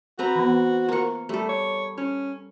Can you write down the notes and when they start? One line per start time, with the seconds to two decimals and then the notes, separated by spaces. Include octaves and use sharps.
0.19 C4 F#4 B4 A#5
0.36 E3 B3
0.89 A#3 F4 A#4 C#6
1.29 G3 A3 A4
1.49 C#5
1.98 C#4 C#5